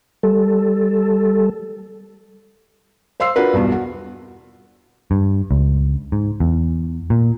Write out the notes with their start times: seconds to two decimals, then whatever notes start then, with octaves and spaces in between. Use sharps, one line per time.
0.23 G3 A4
3.20 C5 F5 C6 E6 C7
3.36 D4 F4 F#4 A#4 B4
3.53 B1 E2 G2 B2
3.72 F#4
5.11 G2
5.51 C#2
6.12 G#2
6.40 E2
7.10 A#2